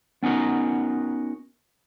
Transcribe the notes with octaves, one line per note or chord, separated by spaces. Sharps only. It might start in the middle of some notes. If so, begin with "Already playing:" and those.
B3 C#4 D#4 F#4 A#4